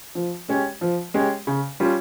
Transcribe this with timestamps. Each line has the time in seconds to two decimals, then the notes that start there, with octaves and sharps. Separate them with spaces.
0.15 F3
0.48 G#3 C#4 G4
0.81 F3
1.14 G#3 C#4 G4
1.47 C#3
1.80 G3 C#4 F4